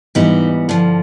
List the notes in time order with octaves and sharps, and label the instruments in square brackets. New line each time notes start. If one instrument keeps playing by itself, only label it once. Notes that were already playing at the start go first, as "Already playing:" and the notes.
[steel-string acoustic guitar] G#2 E3 G3 B3 D#4
G2 D3 F3